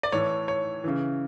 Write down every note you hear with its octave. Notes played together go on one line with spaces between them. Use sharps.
D5
A2 E3 C#5
C#5
C#3 E3